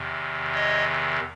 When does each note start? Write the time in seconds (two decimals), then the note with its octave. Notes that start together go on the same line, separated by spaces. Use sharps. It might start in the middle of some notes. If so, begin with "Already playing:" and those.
Already playing: E2 C3 D#3
0.54 C#5 D#5